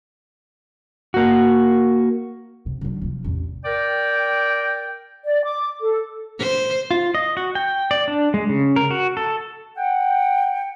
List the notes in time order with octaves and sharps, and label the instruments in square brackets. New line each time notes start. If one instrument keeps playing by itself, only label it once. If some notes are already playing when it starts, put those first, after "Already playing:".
[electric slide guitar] A#3 F#4
[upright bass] C3
D3 F#3
C3 F3
A1 E2
[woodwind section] A#4 D5 G5
[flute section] D5
D6
A4
[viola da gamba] C5
[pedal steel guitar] F4
D#5
F#4
G5
D5
D4
G#3
C#3
A#4
F#4
A4
[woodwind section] F#5 G5